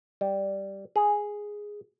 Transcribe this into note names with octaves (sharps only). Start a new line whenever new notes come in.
G3
G#4